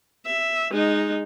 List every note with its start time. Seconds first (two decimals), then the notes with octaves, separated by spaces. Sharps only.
0.26 E5
0.71 G#3 D#4